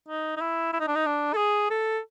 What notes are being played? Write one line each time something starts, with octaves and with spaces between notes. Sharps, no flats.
D#4
D#4
E4
E4
D#4
D4
D#4
D4
A4
G#4
A4